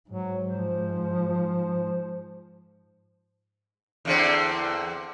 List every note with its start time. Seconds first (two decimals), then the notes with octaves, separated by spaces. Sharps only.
0.10 G#2 F#3
0.48 F3 C5
4.05 E2 D3 C4